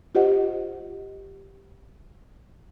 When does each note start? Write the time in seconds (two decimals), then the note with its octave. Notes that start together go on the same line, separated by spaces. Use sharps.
0.15 F4 G4 C5 D#5 F#5